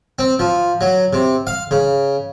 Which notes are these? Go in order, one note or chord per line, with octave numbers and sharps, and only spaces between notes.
C4
F3
F#3
C3
F5
C#3